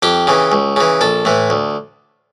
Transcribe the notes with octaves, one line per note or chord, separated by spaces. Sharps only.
F2 G4
C#3 E3
C#2
C#3 E3
A#1 A4
A2 E3
D2